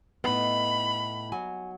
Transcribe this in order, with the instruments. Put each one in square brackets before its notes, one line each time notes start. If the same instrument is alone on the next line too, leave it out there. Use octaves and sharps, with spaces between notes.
[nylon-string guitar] A2 B3 [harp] D#4 [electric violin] B5
[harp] F#3 [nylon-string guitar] G#5